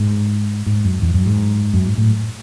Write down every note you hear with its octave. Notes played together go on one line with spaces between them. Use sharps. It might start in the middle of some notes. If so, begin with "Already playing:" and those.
Already playing: G#2
G#2
F#2
E2
F#2
G#2
F#2
G#2
A2